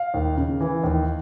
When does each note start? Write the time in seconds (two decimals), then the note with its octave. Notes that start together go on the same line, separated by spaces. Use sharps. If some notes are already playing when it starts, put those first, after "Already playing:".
Already playing: F5
0.14 D#2
0.37 C#3
0.60 E3
0.84 D#2